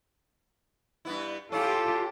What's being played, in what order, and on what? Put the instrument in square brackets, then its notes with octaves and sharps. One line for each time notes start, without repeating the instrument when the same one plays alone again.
[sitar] G2 B3 E4
[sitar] C#4 E4 [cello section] F4 G4 [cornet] A4